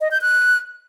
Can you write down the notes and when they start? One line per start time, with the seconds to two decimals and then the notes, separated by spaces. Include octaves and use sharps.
0.01 D#5
0.11 G6
0.21 F#6